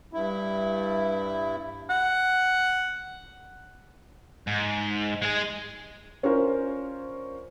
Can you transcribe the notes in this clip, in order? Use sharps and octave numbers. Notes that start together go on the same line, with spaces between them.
G2 E4
F#5
G#2
G#3 G#4
C#4 D4 F4 A#4 C5